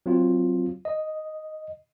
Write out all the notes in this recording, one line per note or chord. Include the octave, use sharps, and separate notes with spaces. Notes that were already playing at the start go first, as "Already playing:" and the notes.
F#3 C4 F4
D#5